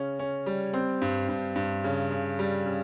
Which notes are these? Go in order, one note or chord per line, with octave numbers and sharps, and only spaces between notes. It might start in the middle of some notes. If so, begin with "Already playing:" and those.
Already playing: C#3 C#4
C#4
G3
C4
G2
G2
G2
C#3
C#3
G3
C#3